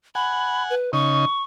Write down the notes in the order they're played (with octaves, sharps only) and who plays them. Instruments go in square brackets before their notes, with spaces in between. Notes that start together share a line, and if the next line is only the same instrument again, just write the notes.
[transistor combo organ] F#5 G#5 [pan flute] B5
[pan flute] B4
[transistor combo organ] C#3 D#4 [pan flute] C#6